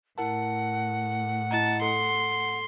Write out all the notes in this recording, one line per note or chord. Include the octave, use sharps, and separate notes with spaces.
A2 E4 A#4 F#5 A5
E4 D#5 A5 A#5
A4 C6